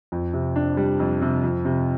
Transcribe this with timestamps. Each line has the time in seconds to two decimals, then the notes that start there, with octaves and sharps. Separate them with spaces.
0.12 F2
0.33 C3
0.56 D4
0.77 G3
0.99 F2
1.22 C3
1.44 F2
1.65 C3